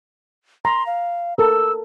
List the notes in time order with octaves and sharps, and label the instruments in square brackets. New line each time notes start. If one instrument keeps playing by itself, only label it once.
[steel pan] A#5 [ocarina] C6
[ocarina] F5
[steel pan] A4 A#4 [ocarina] E6